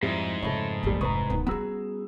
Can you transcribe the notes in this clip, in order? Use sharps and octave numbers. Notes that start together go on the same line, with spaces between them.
F2 G#2 G3 E4
F2 C#3 A3 A4 C#5 E5 B5
A1 E2 A#2 G3
F1 C2 D3 B4 A#5 C#6 D#6
D1 D#3 B3
G3 B3 C#4 F#4 G#4 A#5 E6